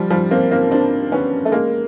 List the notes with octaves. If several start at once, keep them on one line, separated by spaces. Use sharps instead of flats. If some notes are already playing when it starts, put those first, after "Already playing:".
Already playing: F3 G3
F3 G3
A#3 C4
A#3 C4
C4 D4
B3 C#4
A3
G#3 A#3